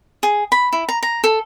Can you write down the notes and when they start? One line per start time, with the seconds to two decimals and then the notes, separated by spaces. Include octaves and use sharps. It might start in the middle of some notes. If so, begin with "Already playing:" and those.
0.23 G#4
0.52 B5
0.73 E4
0.89 A#5
1.03 A#5
1.24 A4